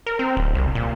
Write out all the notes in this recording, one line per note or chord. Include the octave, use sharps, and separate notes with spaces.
A#4
C4
D1
C2
A#2